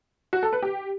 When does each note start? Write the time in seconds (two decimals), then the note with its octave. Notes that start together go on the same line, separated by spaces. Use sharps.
0.33 F#4
0.43 A4
0.53 B4
0.63 G4